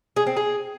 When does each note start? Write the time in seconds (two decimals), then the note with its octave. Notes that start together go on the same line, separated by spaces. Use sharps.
0.16 G#4
0.26 C4
0.37 G#4